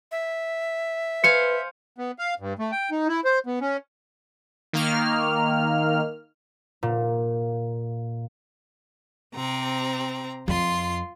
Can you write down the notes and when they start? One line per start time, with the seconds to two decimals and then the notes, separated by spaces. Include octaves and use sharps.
0.12 E5
1.24 B4 C5 F5 G#5 C#7
1.98 B3
2.19 F5
2.40 G2
2.59 A3
2.72 G5
2.91 D#4
3.08 E4
3.25 C5
3.46 B3
3.61 C#4
4.73 D#3 A#3 F6
6.83 A#2
9.35 C3 C4 A#5
10.48 F2 F4 C6